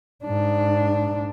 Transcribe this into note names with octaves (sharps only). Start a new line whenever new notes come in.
G#2 D4